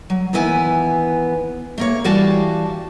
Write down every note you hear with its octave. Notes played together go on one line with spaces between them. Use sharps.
F#3
D#2 E3 B3 E4 G#5
A3 A#3 C#5
E3 G3 F#4 F5 G5 A5